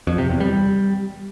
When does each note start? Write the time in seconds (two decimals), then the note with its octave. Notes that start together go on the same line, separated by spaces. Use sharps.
0.07 F2
0.18 C3
0.29 E2
0.40 G3